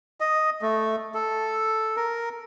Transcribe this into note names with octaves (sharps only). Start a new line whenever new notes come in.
D#5
A3
A4
A#4